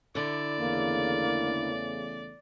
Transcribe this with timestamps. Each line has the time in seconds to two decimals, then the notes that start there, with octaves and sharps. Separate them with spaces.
0.15 D3 E4 D5
0.58 E2 C#3 A3 A#3